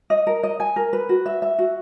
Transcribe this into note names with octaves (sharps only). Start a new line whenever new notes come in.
D#5
A#4
D#5
G#5
A#4
B4
F#4
E5
E5
F#4